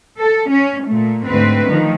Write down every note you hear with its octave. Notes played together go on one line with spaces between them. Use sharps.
A4
C#4
A#2 A3
D2 G#2 C4 B4
D#3 F3